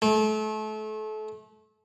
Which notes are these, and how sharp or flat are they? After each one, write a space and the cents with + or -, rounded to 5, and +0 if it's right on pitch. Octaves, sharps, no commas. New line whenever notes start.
A3 -30